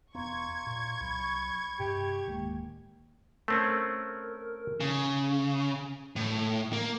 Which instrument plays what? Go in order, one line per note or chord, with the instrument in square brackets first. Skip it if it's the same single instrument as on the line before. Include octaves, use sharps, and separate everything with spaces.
[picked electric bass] E1 B3 [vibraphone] F5 A#5 C6 [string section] C#6 G#6
[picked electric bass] A#2
[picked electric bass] C2 F#3 [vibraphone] B5
[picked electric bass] G2 C3 [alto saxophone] G4
[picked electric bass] D1 D#3 [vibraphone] G#3 A#3
[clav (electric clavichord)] A3 C4 C#4 [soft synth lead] A#4
[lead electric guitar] C#3
A2
A#3